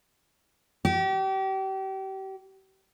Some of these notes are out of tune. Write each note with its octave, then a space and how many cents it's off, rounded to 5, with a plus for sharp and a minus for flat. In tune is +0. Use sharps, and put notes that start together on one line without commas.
G4 -35